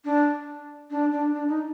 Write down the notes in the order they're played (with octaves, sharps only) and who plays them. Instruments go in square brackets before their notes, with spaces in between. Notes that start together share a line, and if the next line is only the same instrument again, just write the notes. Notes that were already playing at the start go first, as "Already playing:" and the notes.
[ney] D4
D4
D4
D4
D#4